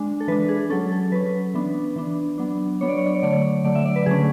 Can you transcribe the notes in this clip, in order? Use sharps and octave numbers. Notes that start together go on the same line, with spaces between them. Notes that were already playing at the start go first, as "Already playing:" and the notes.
Already playing: G#3 D4
A4
E3 G#3 D4 B4
G#4
F#3 C#4 A4
A4
F#3 C#4 B4
E3 B3 D4
E3 B3 D4
F#3 B3 D4
F#3 B3 D4 C#5
D5
C#5
D5
C#5
D3 F#3 A3 D5
C#5
D3 F#3 A3 D5
E5
D5
B4
D3 F#3 A3 C#4 G#4